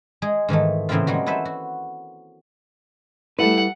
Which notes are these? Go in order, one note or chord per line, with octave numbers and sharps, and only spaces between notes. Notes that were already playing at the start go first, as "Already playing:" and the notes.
G#3 G#4
G#2 D#3 E3 A3
A2 C#3 E3 A#3 C4 F4
G3 G#3 A#3 F#4
E4 A4 B4 C5 E5
F#4
G3 A3 E4 A4 B4 F#5